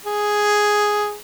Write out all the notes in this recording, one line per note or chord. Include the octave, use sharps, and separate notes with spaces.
G#4